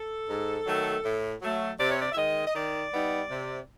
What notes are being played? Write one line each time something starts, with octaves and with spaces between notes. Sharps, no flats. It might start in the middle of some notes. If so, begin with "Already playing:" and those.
Already playing: A4
G#2
D#3 F#3 A3
A2
F#3 A3
C3 D5
C#5
D5
E5
D#3 G#3 D#5
D#5
D#3 D5
G3 B3 D#4
C3